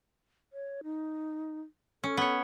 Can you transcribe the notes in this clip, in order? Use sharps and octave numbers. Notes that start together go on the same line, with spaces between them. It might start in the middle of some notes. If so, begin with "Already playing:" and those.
C#5
D#4
C#4 A4
B3 C#5